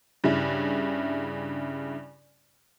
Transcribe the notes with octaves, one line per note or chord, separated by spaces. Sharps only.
G2 C#3 E4